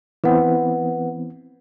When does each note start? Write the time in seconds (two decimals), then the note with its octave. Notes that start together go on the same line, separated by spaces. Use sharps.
0.24 E3 B3 C4 B4 F#5